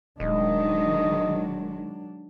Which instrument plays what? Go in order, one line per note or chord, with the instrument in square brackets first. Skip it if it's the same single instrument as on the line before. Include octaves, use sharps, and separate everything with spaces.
[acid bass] D#1 [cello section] D#3 G#3 [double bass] F#3 D4 [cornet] D#5